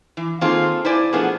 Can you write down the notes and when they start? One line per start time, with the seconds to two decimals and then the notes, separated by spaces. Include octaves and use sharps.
0.17 E3
0.41 D#3 A#3 C4 F4 G#4 A4
0.85 E4 C5 D5 G#5
1.13 B2 F3 A3 B3 D4 G#4